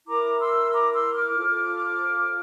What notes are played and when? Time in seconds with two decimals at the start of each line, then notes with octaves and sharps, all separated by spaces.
0.07 E4 A#4 A#5 D6
0.40 C6 E6
0.72 A#5 D6
0.93 C6 E6
1.14 D6 F6
1.35 F4 A4 C5